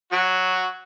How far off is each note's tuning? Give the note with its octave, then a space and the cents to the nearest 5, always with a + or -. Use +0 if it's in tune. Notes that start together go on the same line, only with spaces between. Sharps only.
F#3 +0 F#4 +0